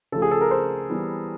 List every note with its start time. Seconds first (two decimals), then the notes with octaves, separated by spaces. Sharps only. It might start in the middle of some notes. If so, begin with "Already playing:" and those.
0.12 C#3 F3 A3 A4
0.22 G#4
0.31 A4
0.41 A#4
0.51 C5
0.90 E3 G3 B3